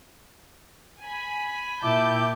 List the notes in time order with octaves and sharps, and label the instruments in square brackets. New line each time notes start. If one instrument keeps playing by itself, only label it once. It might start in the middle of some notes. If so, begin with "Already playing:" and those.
[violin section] G#5 B5
[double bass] A#2 [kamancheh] E4 [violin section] G4 A5 G6 [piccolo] D6